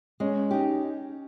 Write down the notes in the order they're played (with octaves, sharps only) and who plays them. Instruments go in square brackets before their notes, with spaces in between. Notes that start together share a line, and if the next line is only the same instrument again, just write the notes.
[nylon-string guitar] G#3 [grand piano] C#4
[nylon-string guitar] D#4 G4